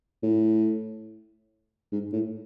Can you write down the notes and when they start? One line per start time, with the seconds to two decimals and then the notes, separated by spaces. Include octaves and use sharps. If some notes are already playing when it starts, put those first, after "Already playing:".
0.23 A2
1.92 G#2
2.13 A2